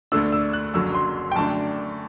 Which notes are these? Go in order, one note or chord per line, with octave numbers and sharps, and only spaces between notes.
D2 D3 A3 D4 E6
E6
F#6
F#1 F#2 D3 F#3 E6
C6
G5
F#2 D3 A3 D4 A5